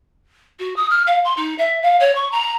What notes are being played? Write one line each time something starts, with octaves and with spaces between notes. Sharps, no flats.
F#4
D#6
F6
F5
C6
D#4
E5
F5
C#5
C#6
A#5